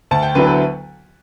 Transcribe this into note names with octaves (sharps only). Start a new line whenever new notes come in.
D2 A5
G5
D3 F#3 B3 E4 B4
B4